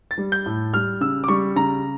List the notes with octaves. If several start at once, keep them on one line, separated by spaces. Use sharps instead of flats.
A6
G3
G6
A2
G3 F6
C#3 E6
D6
G3 C#6
C#3 A#5